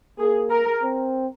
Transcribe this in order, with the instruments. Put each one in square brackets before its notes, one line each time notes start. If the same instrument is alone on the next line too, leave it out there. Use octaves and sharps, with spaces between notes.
[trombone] A#3 [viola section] G#4
[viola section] A#4
[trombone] C4